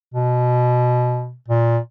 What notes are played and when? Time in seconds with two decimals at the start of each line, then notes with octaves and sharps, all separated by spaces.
0.14 B2
1.49 A#2